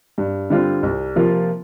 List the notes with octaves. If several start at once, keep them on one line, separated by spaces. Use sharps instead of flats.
G2
D3 G3 C4 F4
C2
C3 F3 A#3 F4